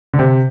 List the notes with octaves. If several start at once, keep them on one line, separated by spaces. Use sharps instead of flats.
D3
C3